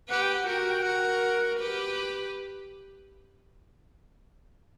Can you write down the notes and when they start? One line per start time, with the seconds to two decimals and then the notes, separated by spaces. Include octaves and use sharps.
0.09 G4 B4 F#5
0.22 G5
0.34 F#5
0.47 F#4 A#4 G5
0.58 F#5
0.71 G5
0.82 F#4 A#4 F#5
1.59 G4 B4